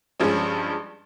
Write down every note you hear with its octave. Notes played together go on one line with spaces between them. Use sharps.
G2 F3 G#3 C#4